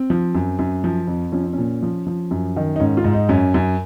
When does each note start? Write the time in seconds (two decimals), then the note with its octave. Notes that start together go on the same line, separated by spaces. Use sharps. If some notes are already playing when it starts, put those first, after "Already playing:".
Already playing: C4
0.10 F3
0.35 F#2
0.59 F#2
0.84 F3
1.08 F2
1.32 F3 C#4
1.43 C4
1.53 A#2 C#4
1.83 F3
2.07 F3
2.31 F#2
2.56 D#3
2.76 D#4
2.80 G#2 C#4
2.97 F4
3.04 G#2
3.14 D#4
3.29 F#2 C#4
3.54 F#2